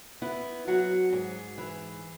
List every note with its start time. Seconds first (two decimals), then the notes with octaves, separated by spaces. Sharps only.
0.22 B3 E4
0.67 F#3 F#4
1.13 G#2 G#4
1.58 E3